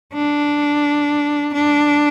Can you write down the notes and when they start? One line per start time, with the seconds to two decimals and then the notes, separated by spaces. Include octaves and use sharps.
0.14 D4
1.54 D4